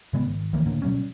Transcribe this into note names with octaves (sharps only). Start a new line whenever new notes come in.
A2 C#3 G#3 B3
G#1
C#2 D#3 E3 A#3
A2 D3 A#3
B2 F#3 G3 C#4